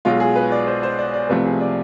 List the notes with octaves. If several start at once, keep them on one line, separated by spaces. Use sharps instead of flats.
B1 B2 G#3 F4
G#4
B4
D5
C5
C5
D5
D5
C2 C3 F3 A3 B4
G#4
D5